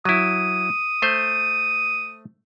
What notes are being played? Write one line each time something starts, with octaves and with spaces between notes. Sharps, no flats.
F#3 E4 D#6
A3 C5